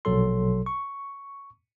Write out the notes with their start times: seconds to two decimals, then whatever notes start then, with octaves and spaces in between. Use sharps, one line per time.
0.05 A#1 B2 F#3 A4 C6
0.66 C#6